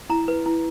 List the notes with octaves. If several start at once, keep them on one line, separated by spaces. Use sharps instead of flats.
E4 A#5
B4
E4